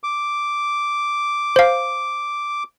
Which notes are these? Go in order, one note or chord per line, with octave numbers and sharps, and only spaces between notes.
D6
C5 F5